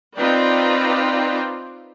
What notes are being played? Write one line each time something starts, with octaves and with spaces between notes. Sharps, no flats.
C4 D#4 F4 B4 D5 G5